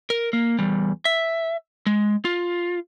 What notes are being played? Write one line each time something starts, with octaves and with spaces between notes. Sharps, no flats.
A#4
A#3
E2 G3
E5
G#3
F4